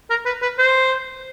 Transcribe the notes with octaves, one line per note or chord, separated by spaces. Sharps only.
A#4
B4
B4
C5